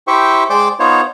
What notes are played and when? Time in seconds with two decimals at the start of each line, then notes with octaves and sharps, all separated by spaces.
0.08 E4 G4 C5 E5 G5 C#6
0.50 G#3 C5 D5 G5 D6
0.80 B3 D#4 F4 C5 C#5